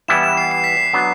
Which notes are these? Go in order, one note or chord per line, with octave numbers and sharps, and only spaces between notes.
E3 G3 B3 E4 E7
E7
C7
C7
B6
C7
F#3 B3 D4